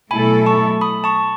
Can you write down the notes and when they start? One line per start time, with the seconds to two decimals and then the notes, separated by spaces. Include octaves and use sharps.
0.11 B2 F#3 A3 E4 A4 G#5 B5
0.46 A5 C#6
0.81 B5 D#6
1.04 A5 C#6